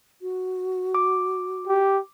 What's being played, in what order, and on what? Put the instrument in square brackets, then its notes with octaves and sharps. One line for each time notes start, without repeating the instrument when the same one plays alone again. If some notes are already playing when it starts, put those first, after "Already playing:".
[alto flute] F#4
[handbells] D6
[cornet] G4